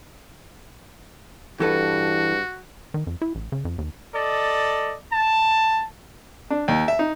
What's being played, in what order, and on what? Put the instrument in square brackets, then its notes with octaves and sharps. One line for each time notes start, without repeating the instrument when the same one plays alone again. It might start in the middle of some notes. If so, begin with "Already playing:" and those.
[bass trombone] G2 [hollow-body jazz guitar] E3 A4 B4 [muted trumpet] F#4
[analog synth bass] D#3
F2
E4
A1
C#3
F2
D#2
[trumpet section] A4 D5 D#5
A5
[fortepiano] D4
D#2
E5
D#4